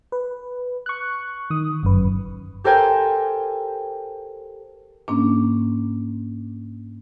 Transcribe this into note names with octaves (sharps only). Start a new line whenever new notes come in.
B4
C#6 F#6
D#3 D#6
G1 F#2 B4
G4 A4 A#4 C5 G5 G#5
G#2 A#3 C#4 D4